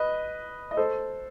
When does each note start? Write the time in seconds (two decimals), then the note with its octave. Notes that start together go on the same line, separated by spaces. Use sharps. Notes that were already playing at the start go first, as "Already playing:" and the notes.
Already playing: B4 D#5
0.71 D#5
0.77 A4 C5